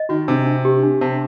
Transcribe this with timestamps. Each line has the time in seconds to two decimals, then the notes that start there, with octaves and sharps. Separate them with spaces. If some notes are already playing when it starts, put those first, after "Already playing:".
Already playing: D#5
0.09 D#3 F#4
0.28 C3 D4
0.46 D4
0.65 G4
0.83 D4
1.01 C3 A5